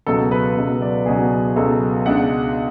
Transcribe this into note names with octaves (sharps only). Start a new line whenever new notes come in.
C#2 B2 F#3 A4
B4
C#2 B2 F#3
D5
C#2 B2 F#3 G#4
C#2 B2 F#3 A4
C#2 B2 G#3 D4 F#5